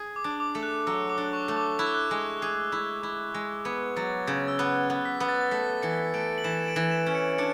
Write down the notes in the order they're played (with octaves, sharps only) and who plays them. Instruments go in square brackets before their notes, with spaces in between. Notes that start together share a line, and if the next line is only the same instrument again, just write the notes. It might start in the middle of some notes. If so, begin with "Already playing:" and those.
Already playing: [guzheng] G#4
[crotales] D6
[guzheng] D4
[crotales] D6
[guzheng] A3
[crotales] F#6
[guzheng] F#3 [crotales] E6
[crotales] D6
[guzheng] D4
[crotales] C#6
[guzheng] A3
[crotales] D6
[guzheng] E4 [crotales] F#6
[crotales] E6
F#6
[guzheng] G#3
G#4
E4
E4
G#3
[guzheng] B3 [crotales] G#6
[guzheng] F#3 [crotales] A6
[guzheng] C#3 [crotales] G#6
[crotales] E6
[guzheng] B3 [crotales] F#6
[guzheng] B3
[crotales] B6
[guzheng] B3
[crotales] A6
A6
[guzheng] A3 [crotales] B6
[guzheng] E3 [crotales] C#7
[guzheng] A3 [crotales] D7
[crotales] F#7
[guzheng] E3 [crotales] E7
[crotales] D7
[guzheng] E3
[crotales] E7
[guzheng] C#4
[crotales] C#7
[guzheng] D4 [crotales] C#7